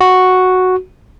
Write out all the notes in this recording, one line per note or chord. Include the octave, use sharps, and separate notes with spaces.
F#4